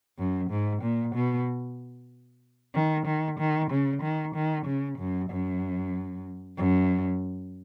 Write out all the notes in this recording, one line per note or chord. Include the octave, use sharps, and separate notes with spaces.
F#2
G#2
A#2
B2
D#3
D#3
D#3
C#3
D#3
D#3
C#3
F#2
F#2
F#2